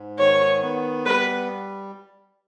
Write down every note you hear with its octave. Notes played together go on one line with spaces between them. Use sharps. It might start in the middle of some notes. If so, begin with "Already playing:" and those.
Already playing: G#2
D#3 C#5
B3
G3 B4